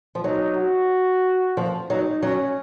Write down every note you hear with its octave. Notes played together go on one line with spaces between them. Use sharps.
F3
F#3 D#4
F#4
F3
F#3 D#4
F#3 C#4